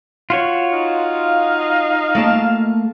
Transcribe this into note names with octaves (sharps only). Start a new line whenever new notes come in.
F4 F#4 C#5
D#4 F5
A3 A#3 A5